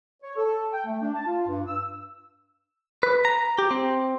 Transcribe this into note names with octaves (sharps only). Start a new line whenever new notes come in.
C#5
A4
G5
A3
D4
A5
F4
G2
E6
B4
A#5
G4
C4